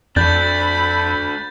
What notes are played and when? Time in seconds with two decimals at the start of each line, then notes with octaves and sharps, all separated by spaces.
0.16 F2 A3 D4 B5 G6 A6